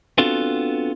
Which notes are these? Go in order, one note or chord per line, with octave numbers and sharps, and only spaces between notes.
B3 C4 D4 F4 F#4 A4